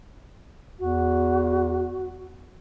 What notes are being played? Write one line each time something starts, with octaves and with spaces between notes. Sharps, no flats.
E2 F#4